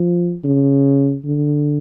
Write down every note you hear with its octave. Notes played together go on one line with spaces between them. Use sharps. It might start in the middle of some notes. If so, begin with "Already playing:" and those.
Already playing: F3
C#3
D3